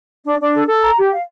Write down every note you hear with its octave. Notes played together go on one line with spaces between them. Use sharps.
D4
D4
A4
A4
A#5
G4
F5